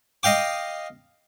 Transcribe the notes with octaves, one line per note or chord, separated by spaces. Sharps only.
D#5 F5 G5 D6